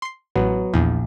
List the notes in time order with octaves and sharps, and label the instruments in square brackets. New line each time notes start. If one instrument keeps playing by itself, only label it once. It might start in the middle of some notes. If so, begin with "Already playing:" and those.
[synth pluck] C6 C7
[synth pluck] A1 [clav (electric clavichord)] F#3 B3
[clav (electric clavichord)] A#1 [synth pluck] E2